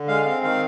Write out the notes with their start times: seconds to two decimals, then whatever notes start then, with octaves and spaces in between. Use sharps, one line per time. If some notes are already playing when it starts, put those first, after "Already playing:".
Already playing: D3
0.08 G#3 F5
0.25 C4 F5
0.43 D#3 F5